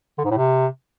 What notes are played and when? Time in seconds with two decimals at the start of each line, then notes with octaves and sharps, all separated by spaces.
0.18 D3
0.25 G#2
0.31 A2
0.37 C3